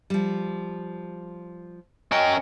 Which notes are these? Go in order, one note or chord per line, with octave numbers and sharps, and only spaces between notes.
F3 G3
C#4 A#4 D#5 G5